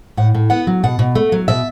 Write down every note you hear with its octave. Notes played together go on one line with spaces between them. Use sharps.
A2 F#5
A2
B3 F#5
F#3
B2 F#5
B2
A3
F#3
B2 E5